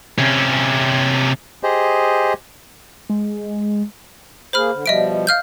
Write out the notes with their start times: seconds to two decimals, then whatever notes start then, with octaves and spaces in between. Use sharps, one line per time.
0.18 C3 C#4
1.63 G4 G#4 C5 D#5
3.09 G#3
4.53 A#3 G#4 C5 B5 F6
4.73 D3
4.86 B2 F3 G3 D#5 E5 D7
5.27 F5 F6 G6